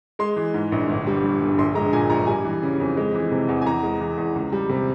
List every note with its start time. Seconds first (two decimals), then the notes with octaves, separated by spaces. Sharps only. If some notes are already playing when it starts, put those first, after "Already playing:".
0.19 G#3 C6
0.36 E3
0.54 G#2
0.72 A#1
0.89 G1
1.07 G3
1.24 G2
1.41 G1
1.58 A#1 C6
1.75 G#3 A#5
1.93 A#2 G#5
2.10 A#1 A#5
2.27 G3 G#5
2.45 E3
2.63 C#3
2.80 F2
2.97 G#3
3.15 E3
3.32 C3
3.48 E2
3.62 G#5
3.66 E2 A#5
3.83 G#3
4.00 E3
4.17 E2
4.36 C#2
4.52 G3
4.69 C3